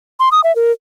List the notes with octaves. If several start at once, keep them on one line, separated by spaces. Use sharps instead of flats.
C6
D#6
E5
A#4